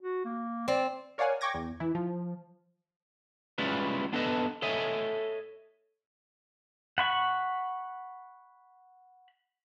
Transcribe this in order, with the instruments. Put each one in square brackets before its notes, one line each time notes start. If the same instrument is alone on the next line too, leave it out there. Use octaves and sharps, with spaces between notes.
[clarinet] F#4
A#3
[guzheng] C4 [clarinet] D5
[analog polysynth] A#4 C#5 D5 F5 F#5 G#5
G5 C#6 D6 G#6 A#6
E2
E3 E4
F3
[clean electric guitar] G3 G#3 C#4 E4 F4 B4
B3 D4 A4 B4 D#5 A5
A4 C#5 D#5 E5 G#5
[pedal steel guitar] F#5 B5 C#6